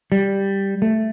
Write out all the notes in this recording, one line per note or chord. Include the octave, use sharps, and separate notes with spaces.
G3
A3